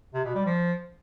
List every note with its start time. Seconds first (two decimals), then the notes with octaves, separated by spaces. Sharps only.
0.14 C3
0.24 B2
0.35 G3
0.46 F3